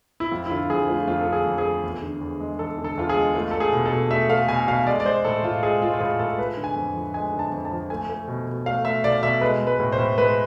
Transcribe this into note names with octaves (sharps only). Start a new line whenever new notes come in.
E4
F2 F4
E4
D3 F4
F2 G#4
A3 F4
F2 F4
A4
D3
G#4
F2
G#4
A3
E2
D3
E2
G#3
E2 A4
D3
A4
E2 F4
G#4
G#3
A3 F4
A3 A4
G#4
B2
A4
B2
A3 E5
A3 F5
B2 G#5
B2 F5
G#3 D5
D5
G#3 C5
A2 A4
A2 F4
G#3 G#4
G#3 F4
F4
A2 G#4
A2 A4
G#3 B4
D3
G#5
F2
F3
G#3 G#5
D3
A5
F2
A5
F3
A3 G#5
A3
B2
B2
A3 F5
A3 E5
B2 D5
B2 E5
G#3 B4
G#3
B4
A2
C5
A2
G#3 B4